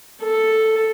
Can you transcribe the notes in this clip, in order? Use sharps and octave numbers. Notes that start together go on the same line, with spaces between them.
A4